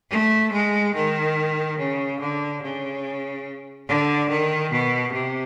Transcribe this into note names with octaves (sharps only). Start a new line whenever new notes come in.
A3
G#3
D#3
C#3
D3
C#3
D3
D#3
B2
C3